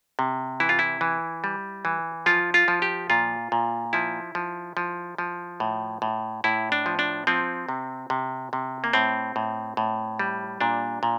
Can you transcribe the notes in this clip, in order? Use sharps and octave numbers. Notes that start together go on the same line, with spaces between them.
C3
E3 E4
F4
E4
E3
G3
E3
F3 F4
F4
F3
G4
A#2 F4
A#2
F3 E4
F3
F3
F3
A2
A2
A2 E4
D4
F3
D4
F3 C4
C3
C3
C3
A#3
A2 C4
A2
A2
G3
A#2 D4
A#2